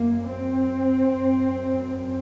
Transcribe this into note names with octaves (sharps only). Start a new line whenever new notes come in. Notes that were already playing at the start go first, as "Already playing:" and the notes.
Already playing: F#2 A#3
C4
F#2
C4